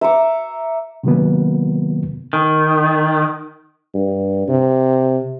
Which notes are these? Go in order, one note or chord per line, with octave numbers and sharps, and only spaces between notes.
E5 A#5 C#6 D6
C3 D#3 F#3 A#3 B3
D#3
G2
C3